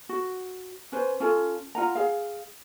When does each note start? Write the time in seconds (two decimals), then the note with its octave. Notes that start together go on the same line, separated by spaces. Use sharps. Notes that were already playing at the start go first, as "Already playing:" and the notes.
0.09 F#4
0.92 C#4 B4 C5
1.20 C#4 F4 A4
1.75 F4 F#5 A#5
1.95 G#4 F5